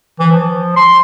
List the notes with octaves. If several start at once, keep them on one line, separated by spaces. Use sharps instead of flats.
E3
F3
C6